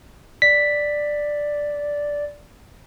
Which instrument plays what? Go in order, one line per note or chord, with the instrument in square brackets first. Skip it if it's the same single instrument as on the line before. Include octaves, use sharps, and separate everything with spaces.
[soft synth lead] D5 [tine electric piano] B6